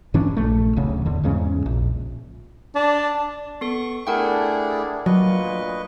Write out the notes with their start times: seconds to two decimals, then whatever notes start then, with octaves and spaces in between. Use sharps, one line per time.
0.14 G2 E3 C#4 D4
0.37 A#1 A3
0.76 D1 D2 C#3
1.06 E2 D3
1.23 E2 G#2 C#3 C#4
1.66 A#1
2.75 D4
3.61 B3 A4 C#6
4.07 A3 D4 E4 G#4 A#4 F#5 G5
5.06 D2 A#2 F#3 B4 D#5 C#6